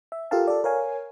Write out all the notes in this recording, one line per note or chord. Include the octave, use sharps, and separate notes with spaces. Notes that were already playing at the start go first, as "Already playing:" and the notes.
E5
F4 G4 A4 A#4 F5 A5
A4 D5
A#4 C#5 F5 G#5